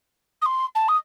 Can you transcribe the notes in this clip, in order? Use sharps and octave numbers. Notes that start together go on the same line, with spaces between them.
D#6
C6
A5
D#6